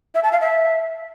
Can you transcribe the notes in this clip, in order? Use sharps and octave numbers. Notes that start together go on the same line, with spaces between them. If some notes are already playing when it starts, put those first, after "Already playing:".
E5
A5
F5
E5